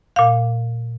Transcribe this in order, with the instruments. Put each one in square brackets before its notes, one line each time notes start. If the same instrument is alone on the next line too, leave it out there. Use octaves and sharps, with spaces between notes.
[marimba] A#2 F5